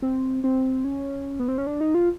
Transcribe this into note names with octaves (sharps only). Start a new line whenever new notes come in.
C4
C4
C#4
B3
C4
C#4
D4
D#4
F4